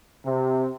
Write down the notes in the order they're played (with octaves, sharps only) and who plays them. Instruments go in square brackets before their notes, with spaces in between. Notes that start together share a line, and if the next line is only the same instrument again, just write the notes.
[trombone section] C3